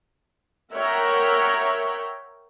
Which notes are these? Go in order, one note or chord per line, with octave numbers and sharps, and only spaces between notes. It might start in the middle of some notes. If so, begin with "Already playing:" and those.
A#4 C#5 E5 F#5 G5 A#5